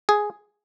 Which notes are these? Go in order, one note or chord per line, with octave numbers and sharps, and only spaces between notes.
G#4